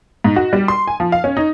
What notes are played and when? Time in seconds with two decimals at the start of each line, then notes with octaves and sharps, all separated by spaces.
0.24 G#2
0.36 F#4
0.53 G3
0.68 C6
0.87 G#5
1.00 F3
1.12 F5
1.24 C#4
1.37 D#4